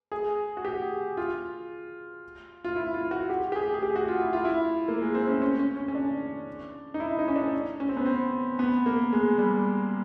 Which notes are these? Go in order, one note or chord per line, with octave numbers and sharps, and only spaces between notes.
G#4
F#4
G4
F4
F4
E4
F4
F#4
G4
G4
G#4
G#4
G4
F#4
F4
E4
F4
E4
A#3
G#3
C4
C#4
C#4
C#4
C#4
C#4
D4
D#4
E4
D#4
C#4
D4
C#4
C4
B3
C4
B3
A#3
G#3
G3